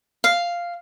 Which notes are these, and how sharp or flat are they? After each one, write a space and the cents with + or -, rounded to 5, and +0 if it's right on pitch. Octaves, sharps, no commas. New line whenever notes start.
F5 -5